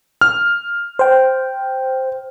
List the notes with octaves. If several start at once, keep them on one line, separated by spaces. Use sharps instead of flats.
F6
C5 G5